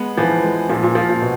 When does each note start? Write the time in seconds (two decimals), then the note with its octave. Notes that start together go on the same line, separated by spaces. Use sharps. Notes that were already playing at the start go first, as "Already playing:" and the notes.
Already playing: G#3 B3
0.17 E3 F3
0.44 G#3
0.69 A#2 F3
0.83 A#2
0.95 F3
1.09 A#2
1.21 B2